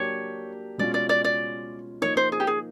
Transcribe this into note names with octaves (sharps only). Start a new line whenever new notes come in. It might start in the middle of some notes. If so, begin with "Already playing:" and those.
Already playing: F#3 A#3 D4 G4 C#5
B2 G#3 C#4 F4 D5
D5
D5
D5
F3 A#3 D#4 C#5
C5
G#4
G4
G#4